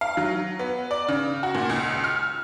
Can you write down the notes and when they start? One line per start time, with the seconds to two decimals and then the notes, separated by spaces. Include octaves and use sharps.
0.01 F5
0.17 F#3
0.59 B3
0.91 D5
1.08 C#3
1.43 F#4
1.55 A#2
1.70 C#2
2.04 F6